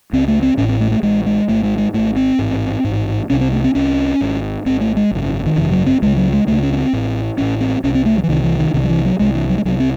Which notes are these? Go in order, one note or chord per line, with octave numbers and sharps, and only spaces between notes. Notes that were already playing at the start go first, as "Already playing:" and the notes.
C#2 C#3 C4
A3
C4
A1 A2 C#4
C4
A3
A3
A1 A2 G#3
G#3
G#1 G#2 A3
G#3
G#3
G#1 G#2 A3
C4
A1 G#2
A1 G#2
C2 C3 C#4
C4
A3
C4
C2 C3 C#4
G#1 G#2
G#1 G#2 C4
A3
G#3
G#1 F#2 C#3
D#3
G#1 F#2 C#3 E3
F#3
C4
C#2 C#3 G#3
F#3
G#3
C#2 C#3 A3
C#4
C#4
C4
A1 A2
A1 A2 C#4
C4
C2 C3 C#4
C4
A3
F#3
E3
C2 C3 D#3
E3
D#3
C2 C3 D#3
F#3
E3
F#3
C2 C3 G#3
E3
F#3
G#3
C2 C3 F#3
C4